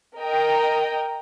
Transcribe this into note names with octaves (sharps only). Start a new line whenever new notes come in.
A#4 D#5 G5